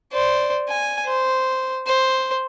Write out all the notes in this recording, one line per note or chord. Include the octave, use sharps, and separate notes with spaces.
C5 D5
G#5
C5
C5